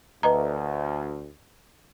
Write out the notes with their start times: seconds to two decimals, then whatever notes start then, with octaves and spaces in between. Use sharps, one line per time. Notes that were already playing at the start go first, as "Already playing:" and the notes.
0.23 D2 B4 D#5 A#5